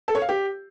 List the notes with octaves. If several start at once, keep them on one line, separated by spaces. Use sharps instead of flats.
A4
C#5
F5
G4